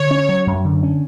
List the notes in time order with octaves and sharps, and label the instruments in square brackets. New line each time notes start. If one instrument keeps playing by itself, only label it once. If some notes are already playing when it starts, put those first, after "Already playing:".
Already playing: [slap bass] D3 [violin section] C#5
[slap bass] C#4
F#3
F#2
D3
C#4